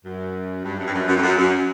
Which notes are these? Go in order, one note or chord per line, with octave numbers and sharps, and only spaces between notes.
F#2
G2
F#2
G2
F#2
F#2
F2
F#2
F#2